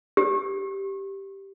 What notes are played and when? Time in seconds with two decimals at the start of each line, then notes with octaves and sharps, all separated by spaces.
0.17 G4